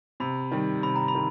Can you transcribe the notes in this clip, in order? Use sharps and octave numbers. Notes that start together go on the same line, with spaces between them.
C3 B5
D#3 G3
C3 B5
A#5
B5
D#3